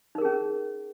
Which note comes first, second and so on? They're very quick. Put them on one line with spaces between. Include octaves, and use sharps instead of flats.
D#4 A#4 G#4 C#4